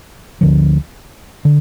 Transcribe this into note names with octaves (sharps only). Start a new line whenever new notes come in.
D2 D3 F3
D3